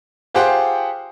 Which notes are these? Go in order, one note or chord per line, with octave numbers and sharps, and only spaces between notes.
F4 G4 G#4 C5 F#5 G5